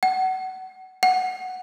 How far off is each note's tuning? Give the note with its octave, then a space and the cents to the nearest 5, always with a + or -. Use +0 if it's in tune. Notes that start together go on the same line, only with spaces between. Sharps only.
F#5 +20
F#5 +0